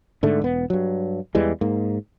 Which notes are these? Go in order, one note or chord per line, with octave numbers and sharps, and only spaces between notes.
G#2 D3 A3
E1 B3
G2 F#3
E2 E3 G3 G#3
G#2 A#3